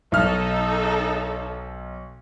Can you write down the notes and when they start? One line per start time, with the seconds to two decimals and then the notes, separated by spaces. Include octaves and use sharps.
0.12 B1 D#4 A4 F6